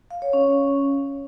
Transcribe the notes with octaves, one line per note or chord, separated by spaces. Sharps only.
F5
C#5
C#4